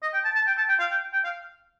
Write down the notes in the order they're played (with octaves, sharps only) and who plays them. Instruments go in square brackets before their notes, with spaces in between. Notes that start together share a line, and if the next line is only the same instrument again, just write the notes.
[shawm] D#5
G5
A5
A5
G5
A5
G5
F5
G5
G5
F5